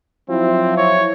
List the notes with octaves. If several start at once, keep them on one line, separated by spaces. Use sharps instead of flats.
F3 F#3 C4 E4
C#5